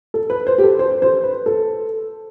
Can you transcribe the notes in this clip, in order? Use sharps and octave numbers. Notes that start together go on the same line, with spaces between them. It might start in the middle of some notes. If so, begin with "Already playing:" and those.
A4
B4
C5
G4
A4
C5
C5
B4
A4